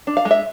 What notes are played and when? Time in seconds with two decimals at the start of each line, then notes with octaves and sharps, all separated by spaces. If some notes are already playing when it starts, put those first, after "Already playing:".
0.07 D4
0.17 F5
0.25 G#3
0.31 E5